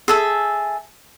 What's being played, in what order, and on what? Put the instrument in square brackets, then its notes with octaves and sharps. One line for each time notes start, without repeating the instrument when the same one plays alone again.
[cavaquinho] G#4 A4 E5